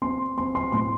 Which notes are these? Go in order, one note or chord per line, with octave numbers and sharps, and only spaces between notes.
C4 C6
C4 C6
C6
A2 C6